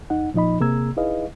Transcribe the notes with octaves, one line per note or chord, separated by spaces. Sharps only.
E2 D#4 F#5
A#2 F3 D#4 D#5 B5
C3 A#3 G#4 A#5 E6 G#6
D#4 E4 G#4 B4 D#5 F5